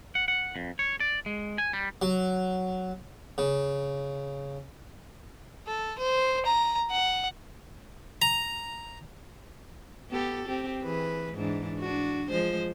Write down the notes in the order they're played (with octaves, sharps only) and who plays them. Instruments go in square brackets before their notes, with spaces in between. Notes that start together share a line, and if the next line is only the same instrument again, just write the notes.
[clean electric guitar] F#5
F#5
F2
C#5
D5
G#3
G#5
G3
[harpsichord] F#3
C#3
[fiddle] A4
C5
A#5
F#5
[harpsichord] A#5
[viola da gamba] B3 G4 A4
C4 G4
E3 G#4 B4
G#2 E3 D4
D4 F#4
F3 G#3 C5